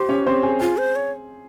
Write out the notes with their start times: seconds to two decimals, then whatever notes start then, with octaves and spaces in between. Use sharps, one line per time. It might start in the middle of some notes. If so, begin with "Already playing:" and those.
Already playing: G4 C5 C6
0.09 C#4 C#5
0.27 C4 C5
0.43 G#4
0.60 F4 G#4
0.77 C5
0.96 C#5